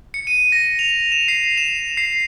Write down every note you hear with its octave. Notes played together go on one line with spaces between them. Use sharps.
C#7
D#7
A#6
F7
E7
C7
E7
C7